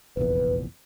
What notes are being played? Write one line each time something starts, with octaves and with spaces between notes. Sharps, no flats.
F1 A#1 E2 B4